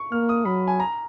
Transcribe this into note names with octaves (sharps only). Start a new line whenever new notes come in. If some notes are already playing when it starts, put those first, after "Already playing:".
Already playing: C#6
A#3 F6
D#6
F#3 B5
G#5
A#5